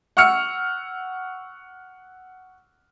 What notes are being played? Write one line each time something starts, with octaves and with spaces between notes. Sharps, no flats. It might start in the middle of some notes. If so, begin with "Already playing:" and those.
F#5 C#6 E6 F6 C#7